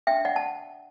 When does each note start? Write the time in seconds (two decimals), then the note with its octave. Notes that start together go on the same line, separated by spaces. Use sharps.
0.07 D4 E5 G5
0.25 D5 F#5
0.36 A5